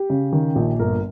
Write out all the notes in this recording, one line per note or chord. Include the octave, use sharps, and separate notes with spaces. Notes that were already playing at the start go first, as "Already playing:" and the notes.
Already playing: G4
C#3
D#3
A#1
G1 A#4